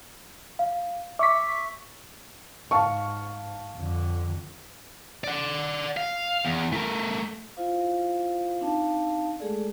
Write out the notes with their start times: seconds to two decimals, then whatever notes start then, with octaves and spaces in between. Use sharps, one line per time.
0.59 F5
1.19 E5 C#6 D6 B6
2.71 G#2 F5 A5 C#6
3.76 F2 D3
5.24 D5 F#5
5.97 F5
6.45 E2
6.72 A3 A#4
7.57 E4 F4 C5 F5
8.61 C4 D4 D#4 F5 A5
9.40 G#3 A3 G#4 A4 D5